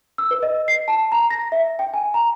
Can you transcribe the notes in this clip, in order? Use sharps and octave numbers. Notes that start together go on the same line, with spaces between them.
E6
B4
D#5
C7
A5
A#5
A#6
E5
G5
G#5
A#5